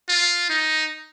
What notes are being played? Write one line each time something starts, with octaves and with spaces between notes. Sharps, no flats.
F4
D#4